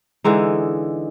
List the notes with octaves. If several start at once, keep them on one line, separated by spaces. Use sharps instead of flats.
D3 E3 G#3 D#4